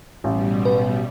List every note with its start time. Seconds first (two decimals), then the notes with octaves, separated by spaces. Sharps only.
0.24 A1 B2 G3
0.65 B4